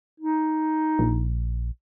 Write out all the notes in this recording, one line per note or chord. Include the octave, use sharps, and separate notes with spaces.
D#4
A#1